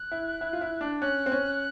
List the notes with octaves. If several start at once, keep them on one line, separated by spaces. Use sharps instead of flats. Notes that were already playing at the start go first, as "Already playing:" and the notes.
Already playing: F#6
E4
E4
F4
E4
D4
C#4 F#6
C4
C#4